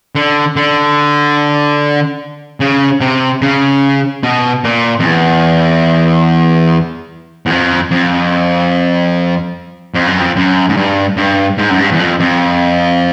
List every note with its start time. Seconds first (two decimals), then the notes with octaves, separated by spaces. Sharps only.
0.15 D3
0.56 D3
2.60 C#3
3.01 C3
3.42 C#3
4.23 B2
4.64 A#2
5.00 F2
5.05 E2
7.46 E2
7.50 F2
7.91 F2
9.94 F2
10.07 F#2
10.20 F2
10.36 F#2
10.69 G#2
10.77 G2
11.17 G2
11.58 G#2
11.70 F#2
11.79 G2
11.92 E2
11.99 F2
12.20 F2